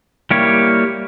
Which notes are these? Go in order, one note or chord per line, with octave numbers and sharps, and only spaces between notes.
G3 A#3 E4 G4 C#5